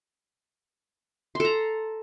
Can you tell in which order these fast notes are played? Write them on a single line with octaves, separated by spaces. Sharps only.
C6 A4 A#5